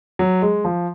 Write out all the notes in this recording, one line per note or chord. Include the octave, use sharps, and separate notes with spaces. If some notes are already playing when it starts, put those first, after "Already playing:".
F#3
G#3
F3